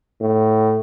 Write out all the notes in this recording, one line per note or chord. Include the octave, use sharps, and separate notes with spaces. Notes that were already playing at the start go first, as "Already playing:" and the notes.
A2